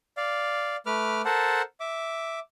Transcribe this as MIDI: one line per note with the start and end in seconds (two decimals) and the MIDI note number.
0.17 0.76 74
0.17 0.76 77
0.86 1.22 57
0.86 1.22 71
0.86 1.22 86
0.86 1.22 89
1.25 1.62 69
1.25 1.62 70
1.25 1.62 72
1.25 1.62 78
1.25 1.62 81
1.80 2.39 76
1.80 2.39 86